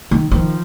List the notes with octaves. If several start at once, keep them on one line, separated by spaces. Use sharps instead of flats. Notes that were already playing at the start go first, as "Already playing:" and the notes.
D#3
D#3 F3